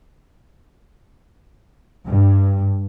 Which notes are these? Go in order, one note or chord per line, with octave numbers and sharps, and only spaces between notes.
G2